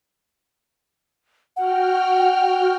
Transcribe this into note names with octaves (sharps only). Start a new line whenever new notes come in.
F#4 F#5 G5 F6